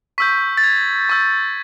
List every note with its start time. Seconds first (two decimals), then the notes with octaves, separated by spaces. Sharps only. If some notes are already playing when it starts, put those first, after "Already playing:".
0.18 C#6 E6 G6 B6
0.57 A6
0.63 G#6
1.09 C#6 E6 G6